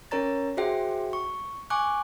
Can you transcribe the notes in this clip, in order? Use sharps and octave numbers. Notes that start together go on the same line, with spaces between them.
C#4 A#4 C#5 A#5 A6
F#4 G#4 C5 E5 F#5 G5
C#6
G#5 C#6 D6 F#6